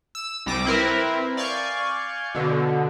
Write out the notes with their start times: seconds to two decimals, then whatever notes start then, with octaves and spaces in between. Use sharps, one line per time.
0.15 E6
0.46 C2 G3 D6 A#6
0.65 C4 E4 A#4 B4
1.37 D5 F5 G#5 C#6 G6
2.34 B2 D3